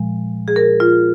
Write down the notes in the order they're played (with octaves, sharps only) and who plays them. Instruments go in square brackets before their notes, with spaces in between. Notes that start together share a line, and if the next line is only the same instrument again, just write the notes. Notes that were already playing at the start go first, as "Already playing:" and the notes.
Already playing: [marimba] A#2 F3 G#3
G#4
A#4
F4